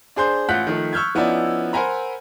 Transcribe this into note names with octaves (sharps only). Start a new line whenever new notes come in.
D4 G#4 C5 C6 G6
A1 F4 F#5 F#6 G6 B6
D#3 F3 A3
C#6 E6 F6 G6 G#6
F3 B3 C#4 D#4 E4 D5
A#4 C5 F#5 G#5 A#5 B5